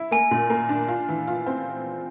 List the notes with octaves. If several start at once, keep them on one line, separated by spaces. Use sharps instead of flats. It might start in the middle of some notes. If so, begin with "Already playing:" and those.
Already playing: E4
A#3 G#5
A#2
A#3
D4
F4
E3
F4
C4